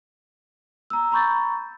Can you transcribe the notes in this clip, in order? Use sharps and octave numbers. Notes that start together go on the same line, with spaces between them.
A#5 E6
A#5 B5 C#6 G6 A6